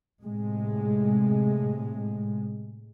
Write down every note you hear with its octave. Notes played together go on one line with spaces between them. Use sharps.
A2 C3 G#3